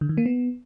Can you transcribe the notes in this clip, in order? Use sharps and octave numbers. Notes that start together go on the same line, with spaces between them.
D3
D#3
A#3
B3